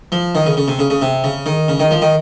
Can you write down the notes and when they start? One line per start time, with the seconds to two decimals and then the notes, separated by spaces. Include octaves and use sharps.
0.12 F3
0.35 D#3
0.46 C#3
0.57 C#3
0.68 C3
0.79 C#3
0.90 C#3
1.02 C3
1.24 C#3
1.46 D#3
1.68 C#3
1.80 D#3
1.91 F3
2.02 D#3